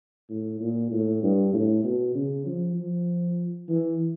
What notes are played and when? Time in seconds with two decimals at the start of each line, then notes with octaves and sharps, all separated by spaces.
0.30 A2
0.61 A#2
0.92 A2
1.23 G2
1.54 A2
1.84 B2
2.15 C#3
2.46 F3
2.77 F3
3.69 E3